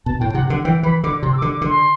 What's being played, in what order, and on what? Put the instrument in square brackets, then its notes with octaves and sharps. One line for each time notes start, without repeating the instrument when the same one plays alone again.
[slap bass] B2 [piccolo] A5
[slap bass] A2 [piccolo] G5
[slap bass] C3 [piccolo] F#5
[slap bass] D3 [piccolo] F#5
[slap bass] E3 [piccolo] G5
[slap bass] E3 [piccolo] B5
[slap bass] D3 [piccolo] D6
[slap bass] C3 [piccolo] C6
[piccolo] E6
D6
[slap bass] D3
[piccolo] D6
[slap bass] D3
[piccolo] C6